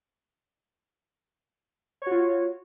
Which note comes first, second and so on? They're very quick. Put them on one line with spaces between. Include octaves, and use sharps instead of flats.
C#5 F#4 F4